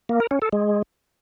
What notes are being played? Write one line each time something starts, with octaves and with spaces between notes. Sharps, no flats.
A#3
A#4
C#4
A4
G#3